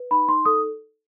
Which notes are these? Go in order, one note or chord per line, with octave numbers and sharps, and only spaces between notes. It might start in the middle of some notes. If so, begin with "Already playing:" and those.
Already playing: B4
D#4 B5
D#4 C6
A4 D#6